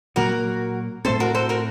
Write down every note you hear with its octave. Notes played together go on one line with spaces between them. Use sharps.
A#2 F#3 A#3 F#4 A#4
A2 A3 C4 A4 C5
F#4 A#4
A4 C5
F#4 A#4